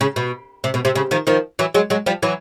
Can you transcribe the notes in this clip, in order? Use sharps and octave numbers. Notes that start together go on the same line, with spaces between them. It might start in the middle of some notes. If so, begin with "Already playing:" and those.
C#3
B2
C3
B2
C3
C#3
D#3 F3
D#3 F3
E3 F#3
F#3 G#3
F#3 G#3
F3 G3
E3 F#3